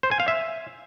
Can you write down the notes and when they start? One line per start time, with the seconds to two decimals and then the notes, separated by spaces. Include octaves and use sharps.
0.03 C5
0.11 G#5
0.20 F5
0.28 E5